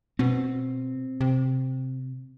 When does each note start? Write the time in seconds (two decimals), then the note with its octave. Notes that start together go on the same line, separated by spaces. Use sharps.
0.19 B2 C4
1.21 C3